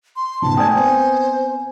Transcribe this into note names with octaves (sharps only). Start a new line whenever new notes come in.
C6
C#2 G#2 B2 A5
A3 D5 G5 G#5 D#6 G#6
B3 C4 C5 G#5